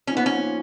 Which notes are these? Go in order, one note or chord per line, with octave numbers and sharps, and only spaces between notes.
F3 A#3 C#4 D#4
B3
C#4